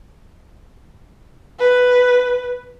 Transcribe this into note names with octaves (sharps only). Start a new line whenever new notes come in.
B4